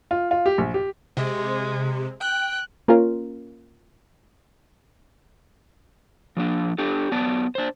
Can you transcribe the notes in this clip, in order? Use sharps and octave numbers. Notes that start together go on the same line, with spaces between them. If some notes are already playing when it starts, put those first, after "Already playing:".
F4
F4
G4
A#1
G4
C3 G#3
G5 F#6
A#3 C#4 F4 A#4
F3 A#3 D4
D4 G4 A4
F#3 B3 D5 A5
D4 C5